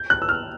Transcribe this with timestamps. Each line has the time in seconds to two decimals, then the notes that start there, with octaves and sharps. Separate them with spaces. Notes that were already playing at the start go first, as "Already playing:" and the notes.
Already playing: G6
0.10 F#6
0.22 E6
0.29 F6